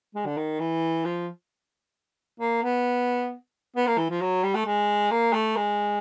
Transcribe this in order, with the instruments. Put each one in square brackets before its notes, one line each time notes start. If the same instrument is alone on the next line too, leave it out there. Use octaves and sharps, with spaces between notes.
[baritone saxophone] G#3
D3
D#3
E3
F3
A#3
B3
B3
A#3
E3
F3
F#3
G3
A3
G#3
A#3
A3
G#3